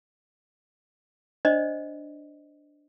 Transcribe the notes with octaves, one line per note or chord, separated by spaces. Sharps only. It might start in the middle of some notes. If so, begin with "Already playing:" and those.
D4 C5 D5 D#5